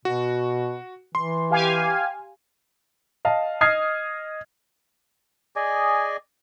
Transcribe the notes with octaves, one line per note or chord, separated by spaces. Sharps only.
B2 F#4
E3 C6
G4 F5 G#5
D#5 F5 A5
D#5 D#6 F6 G#6 C7
G#4 D5 D#5 G#5